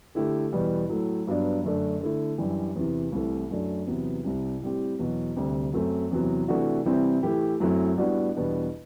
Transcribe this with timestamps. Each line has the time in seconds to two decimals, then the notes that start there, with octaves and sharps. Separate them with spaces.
0.15 D3 A3 E4 G4
0.52 E2 B2 G3 B3
0.89 A2 F#3 A3
1.27 G2 F#3 B3 D4
1.63 F#2 D3 A3 D4
2.01 D3 A3 E4
2.38 F#2 E3 G3 D4 G4
2.76 E2 C3 E3
3.12 C2 C3 E3 A3
3.51 F#2 F#3 A3 D4
3.87 E2 C3 F#3 B3
4.24 C2 C3 G3
4.62 A2 G3 C4 G4
4.99 E2 B2 F#3
5.36 D2 C3 G3
5.73 F#2 F#3 A3 C4
6.11 E2 C3 F#3 B3
6.48 C3 E3 A3 D4 F#4
6.86 C3 E3 G3 C4 E4
7.23 A2 E3 A3 E4 G4
7.60 F#2 F#3 A3 C4 E4
7.98 A2 G3 B3 D4 F#4
8.35 E2 B2 G3 B3 D4